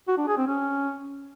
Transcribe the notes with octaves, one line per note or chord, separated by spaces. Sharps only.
F#4
D4
G#4
C4
C#4